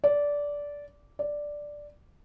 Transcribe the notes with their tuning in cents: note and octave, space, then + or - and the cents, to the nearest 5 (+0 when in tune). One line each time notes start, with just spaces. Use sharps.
D5 -15
D5 +0